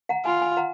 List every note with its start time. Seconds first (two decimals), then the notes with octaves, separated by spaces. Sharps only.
0.09 F#5 A#5
0.25 F4 G#5 B5
0.41 G#5 B5
0.57 F#5 A#5